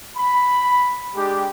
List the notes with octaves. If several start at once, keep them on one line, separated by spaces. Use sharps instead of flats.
B5
G#3 D4 G4